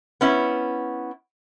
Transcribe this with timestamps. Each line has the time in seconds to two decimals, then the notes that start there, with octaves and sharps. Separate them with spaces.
0.21 B3 C#4 E4